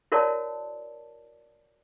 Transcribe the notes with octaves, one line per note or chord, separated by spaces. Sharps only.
E4 F#4 A#4 C#5 D5 A5